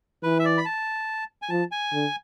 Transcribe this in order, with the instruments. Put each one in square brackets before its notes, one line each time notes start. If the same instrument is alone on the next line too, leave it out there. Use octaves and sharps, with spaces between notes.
[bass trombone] E3 [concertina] B4
[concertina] E5
D5
B5
A5
G#5
[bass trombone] F3 [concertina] A5
[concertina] G#5
[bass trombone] D3